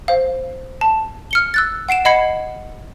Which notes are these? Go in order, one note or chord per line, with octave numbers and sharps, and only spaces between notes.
C5 F5
A5
F6 C#7 G7
E6 F#6 A6
F#5 C7 D7 E7
D#5 F#5 B5 G#6 C7 C#7